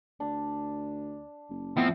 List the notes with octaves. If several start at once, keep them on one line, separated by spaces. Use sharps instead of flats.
D2 D4
F#1
A2 F3 B3 C4 E4